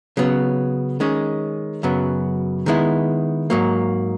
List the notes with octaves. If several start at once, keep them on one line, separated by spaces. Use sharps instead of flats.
C#3 F#3 B3
D#3 G#3 C#4
F#2 C#3 F#3 B3
D#3 G#3 B3 E4
G#2 F#3 A#3